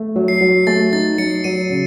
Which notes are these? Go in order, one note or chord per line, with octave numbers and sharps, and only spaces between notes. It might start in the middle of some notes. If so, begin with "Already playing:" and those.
Already playing: A3
F#3
C7
F#3
A3 A6
D#4 A6
F#3 C#7
F#3 D#7
C#3